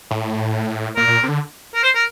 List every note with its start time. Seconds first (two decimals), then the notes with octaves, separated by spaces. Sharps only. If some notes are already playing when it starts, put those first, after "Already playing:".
0.11 A2
0.96 A#2 A#4
1.08 A#2
1.23 C3
1.29 D3
1.75 A#4
1.83 C5
1.95 A#4